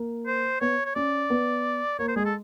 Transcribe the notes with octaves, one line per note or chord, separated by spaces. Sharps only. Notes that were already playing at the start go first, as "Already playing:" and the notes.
Already playing: A#3
C5
B3 C#5
C#5
C#4 D5
B3
A#3 C#5
C5
G#3 G#4
A4